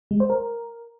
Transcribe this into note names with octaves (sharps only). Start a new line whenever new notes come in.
G#3
C5
A#4